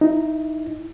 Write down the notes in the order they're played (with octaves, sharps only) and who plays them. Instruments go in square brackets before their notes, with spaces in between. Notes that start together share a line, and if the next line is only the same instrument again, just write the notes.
[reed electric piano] D#4 E4